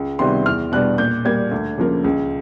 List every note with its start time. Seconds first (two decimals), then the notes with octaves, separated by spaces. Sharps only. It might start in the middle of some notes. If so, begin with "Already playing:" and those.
Already playing: C#2
0.19 C3 D#3 G3 B3 C6
0.46 E2 F6
0.72 B2 G3 B3 D4 F#6
0.98 A#2 G6
1.25 G3 A#3 G#6
1.51 D2
1.78 C#3 F3 A#3
2.04 C#2